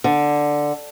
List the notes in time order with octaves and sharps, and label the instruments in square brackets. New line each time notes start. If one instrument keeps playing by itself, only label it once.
[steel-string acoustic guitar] D3